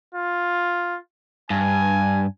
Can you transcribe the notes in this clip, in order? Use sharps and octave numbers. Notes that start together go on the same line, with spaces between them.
F4
G2 G#5